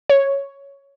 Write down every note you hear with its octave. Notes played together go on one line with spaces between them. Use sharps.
C#5